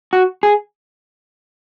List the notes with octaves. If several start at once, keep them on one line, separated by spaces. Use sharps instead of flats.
F#4
G#4